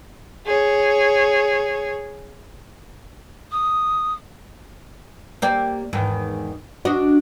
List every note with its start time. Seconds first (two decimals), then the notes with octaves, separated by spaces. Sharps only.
0.47 G#4 C#5
3.52 D#6
5.42 A#3 G4 D5
5.93 E2 G#2 D#3
6.85 D4 F#4 D#5